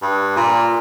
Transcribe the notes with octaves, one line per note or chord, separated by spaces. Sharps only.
G2
A#2